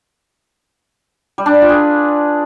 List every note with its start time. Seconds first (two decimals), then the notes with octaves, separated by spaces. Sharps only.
1.38 G3
1.46 D4
1.54 B4
1.61 F4
1.69 G#4